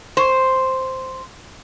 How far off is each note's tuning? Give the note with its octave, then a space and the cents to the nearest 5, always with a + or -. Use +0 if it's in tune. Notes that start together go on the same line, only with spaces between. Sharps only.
C5 +0